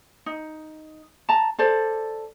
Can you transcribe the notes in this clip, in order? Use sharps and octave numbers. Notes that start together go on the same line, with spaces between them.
D#4
A5 A#5
A4 C5 D5